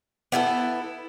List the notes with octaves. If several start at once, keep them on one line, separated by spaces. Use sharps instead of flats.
B3 E4 G#4 A4